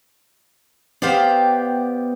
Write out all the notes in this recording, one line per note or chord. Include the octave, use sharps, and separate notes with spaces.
B3 G4 C5 D5 F5 G5